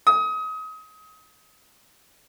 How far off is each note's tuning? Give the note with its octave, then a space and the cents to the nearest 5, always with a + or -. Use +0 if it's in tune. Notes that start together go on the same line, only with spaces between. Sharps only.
D#6 +30